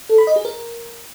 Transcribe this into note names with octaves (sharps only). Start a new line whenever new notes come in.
A4
B5
D#5
G#4
A#4